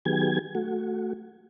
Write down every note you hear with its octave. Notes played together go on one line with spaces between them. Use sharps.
D#3 F#3 B3 G4 G#4 G#6
A3 F#4